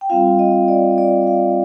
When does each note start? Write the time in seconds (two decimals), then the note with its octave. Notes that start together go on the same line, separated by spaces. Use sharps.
0.01 G5
0.10 G3 C4 F4 F5
0.39 D#5
0.68 D5
0.98 D5
1.27 F5